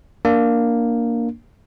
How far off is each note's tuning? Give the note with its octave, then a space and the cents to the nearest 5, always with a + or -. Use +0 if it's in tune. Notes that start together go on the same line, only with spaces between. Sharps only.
A#3 +0 D4 +0